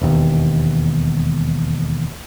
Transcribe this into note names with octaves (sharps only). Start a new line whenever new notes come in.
E1 D#2